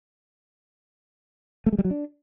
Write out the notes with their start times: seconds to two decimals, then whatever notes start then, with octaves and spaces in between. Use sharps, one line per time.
1.66 A3
1.72 G#3
1.78 G3
1.85 F#3
1.91 D4